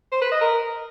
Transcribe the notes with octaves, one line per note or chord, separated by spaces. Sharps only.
C5
B4
D#5
A#4